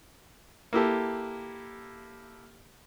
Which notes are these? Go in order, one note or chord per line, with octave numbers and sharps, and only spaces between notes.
A#3 E4 G4 A4